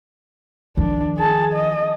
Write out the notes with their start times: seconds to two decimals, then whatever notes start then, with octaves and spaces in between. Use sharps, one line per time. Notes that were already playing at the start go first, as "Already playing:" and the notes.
0.77 D#3 F3 D4
1.18 G#4 A5
1.54 D#5